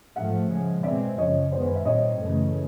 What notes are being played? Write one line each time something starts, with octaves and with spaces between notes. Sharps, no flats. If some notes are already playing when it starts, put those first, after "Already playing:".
G#2 F3 A3 E5 F#5
C#3 F3 G#3
B2 G#3 C4 D5 E5
F#2 C#3 F3 C#5 D#5
F#2 D#3 G#3 B3 C5 D5
E5
A#2 G3 C4 C#5 D#5
F#2 C#3 E3 A3